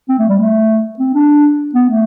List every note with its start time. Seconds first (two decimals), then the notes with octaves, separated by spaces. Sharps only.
0.09 C4
0.19 A3
0.29 G3
0.39 A3
0.99 C4
1.14 D4
1.74 B3
1.89 A3